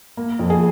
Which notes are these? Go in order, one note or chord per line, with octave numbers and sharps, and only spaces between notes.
A#3
F2
G#4